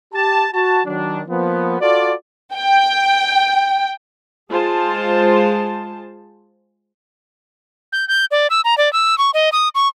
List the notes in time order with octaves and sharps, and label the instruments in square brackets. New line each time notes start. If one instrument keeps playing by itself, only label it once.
[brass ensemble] G4 A5
F#4 A5
D#3 F#3 D4
F3 A#3 B3
F4 F#4 A4 D5
[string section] G5
[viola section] G#3 F4 G#4 C5 A5
[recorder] G6
G6
D5
E6
A#5
D5
E6
C#6
D#5
D#6
C#6